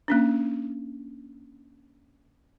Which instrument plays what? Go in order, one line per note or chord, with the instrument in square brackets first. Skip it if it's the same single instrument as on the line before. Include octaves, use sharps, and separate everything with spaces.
[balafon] A#3 C#4 D4